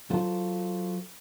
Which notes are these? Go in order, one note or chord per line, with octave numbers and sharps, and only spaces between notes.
F#3 F4 A4 C5